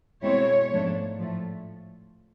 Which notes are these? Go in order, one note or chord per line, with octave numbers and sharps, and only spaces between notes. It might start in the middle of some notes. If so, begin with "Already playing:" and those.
B2 G#3 C4 E4 C#5
G#2 F3 A3 D4
A2 F3 A3